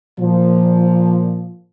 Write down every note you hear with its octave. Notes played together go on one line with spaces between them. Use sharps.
A#2 F3